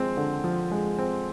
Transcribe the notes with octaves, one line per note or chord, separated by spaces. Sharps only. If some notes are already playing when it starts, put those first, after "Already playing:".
Already playing: F3 G#3 C4
D3
F3
G#3
C4